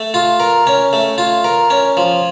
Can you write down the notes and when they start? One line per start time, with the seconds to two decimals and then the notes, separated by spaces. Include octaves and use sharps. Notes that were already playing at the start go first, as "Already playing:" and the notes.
Already playing: A3
0.14 F4
0.40 A#4
0.67 C#4
0.93 A3
1.18 F4
1.44 A#4
1.70 C#4
1.97 F3